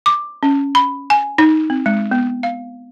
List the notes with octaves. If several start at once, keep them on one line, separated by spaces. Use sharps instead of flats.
D6
C#4
B5
G#5
D#4
C4
G#3
B3
F5